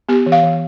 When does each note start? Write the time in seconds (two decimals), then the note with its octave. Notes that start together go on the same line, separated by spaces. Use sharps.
0.09 B3 G4
0.26 E3
0.32 F5
0.43 E3